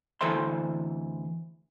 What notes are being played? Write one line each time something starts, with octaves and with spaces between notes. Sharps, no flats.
D2 E3 A4 C5 E5 C6